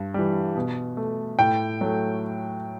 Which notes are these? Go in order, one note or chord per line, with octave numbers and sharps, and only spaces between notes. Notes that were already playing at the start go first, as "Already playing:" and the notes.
Already playing: G2
E3 G3
B2
A3
A2 G5
F#3 A3